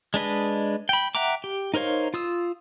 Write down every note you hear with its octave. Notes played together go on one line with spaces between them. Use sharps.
G#3 D4 B4 D#5
G5 B5
E5 F#5 G5 A#5 D6
G4
D#4 A#4 C5 C#5 F5
F4 D#6 E6